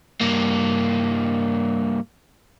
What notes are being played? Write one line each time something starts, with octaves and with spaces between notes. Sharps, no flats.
G2 A#3